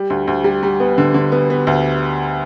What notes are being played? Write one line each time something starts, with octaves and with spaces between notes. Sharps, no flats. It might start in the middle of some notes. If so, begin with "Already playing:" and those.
Already playing: G3
D2
D2
G3
G3
B3
D3
D3
B3
B3
D2